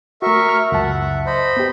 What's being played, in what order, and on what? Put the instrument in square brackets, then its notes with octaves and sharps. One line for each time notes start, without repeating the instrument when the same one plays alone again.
[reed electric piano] A3 F#4 [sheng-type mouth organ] A#4 E5 C#6
[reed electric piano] F6
[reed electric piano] C#2 F#2 A5 [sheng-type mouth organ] E5 F#5
[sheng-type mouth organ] C5 D#5 B5
[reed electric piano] B3 G4